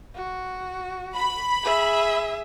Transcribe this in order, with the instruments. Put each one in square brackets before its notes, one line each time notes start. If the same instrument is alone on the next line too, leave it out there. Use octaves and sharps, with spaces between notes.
[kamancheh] F#4
[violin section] B5
[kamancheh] G#4 E5